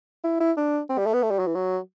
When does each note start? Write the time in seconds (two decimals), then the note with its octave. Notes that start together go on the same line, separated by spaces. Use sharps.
0.24 E4
0.40 E4
0.57 D4
0.90 C4
0.98 G3
1.06 A3
1.14 B3
1.22 A3
1.31 G3
1.39 F#3
1.46 E3
1.55 F#3